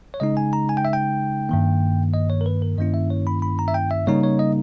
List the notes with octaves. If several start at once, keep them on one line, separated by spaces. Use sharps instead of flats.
C#5
C#3 G#3 D#4 D#5
G#5
A#5
G#5
G5
E5
G5
G2 D#3 A#3
D#5
C#5
A#4
B4
A#4
G2 D#3 A#3 C#4 E4 D#5
E5
C#5
B5
B5
A#5
E5
G5
E5
C#3 G3 A#3 D#4 C#5
C#5
D#5